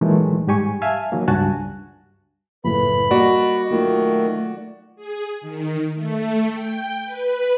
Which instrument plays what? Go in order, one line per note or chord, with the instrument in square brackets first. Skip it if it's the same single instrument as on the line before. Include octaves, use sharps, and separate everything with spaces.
[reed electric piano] A#2 D#3 E3 F#3 G#3 A3
G#2 G3 G4 G#5 C#6
E5 F5 G#5 A5
D#3 F#3 A#3
C#2 G2 F#4 G#5 A5 F#6
[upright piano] F#1 A2 [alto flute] B4 [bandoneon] B5
[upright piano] G3 A#3 [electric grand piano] F#4 D5 [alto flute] D#5
[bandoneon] D#3 [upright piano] F#3 A#3 F4 [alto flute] A3
[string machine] G#4
D#3
A3
G5
B4